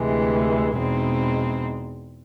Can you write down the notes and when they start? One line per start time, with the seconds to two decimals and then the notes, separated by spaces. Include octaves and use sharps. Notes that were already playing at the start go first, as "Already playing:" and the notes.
Already playing: D2 C3 E3 G#3
0.76 E2 B2 G#3 C4 D#4